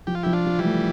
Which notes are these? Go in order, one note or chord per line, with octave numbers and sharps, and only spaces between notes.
F3 G4
F4
F3 E4 G4
D4 F4
F3
E3 G3
A3